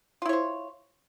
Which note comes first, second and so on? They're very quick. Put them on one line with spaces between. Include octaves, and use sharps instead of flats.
F4 E4 C#5 C5